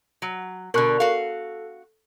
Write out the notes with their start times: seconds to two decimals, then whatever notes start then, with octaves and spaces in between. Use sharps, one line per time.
0.22 F#3
0.74 B2 D3 A#4 C#6 F#6
1.00 F#4 A4 F5